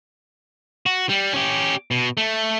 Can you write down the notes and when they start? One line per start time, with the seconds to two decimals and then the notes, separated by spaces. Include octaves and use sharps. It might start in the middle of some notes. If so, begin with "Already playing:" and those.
0.86 F#4
1.09 G3
1.33 C#4 G4
1.91 B2
2.17 A3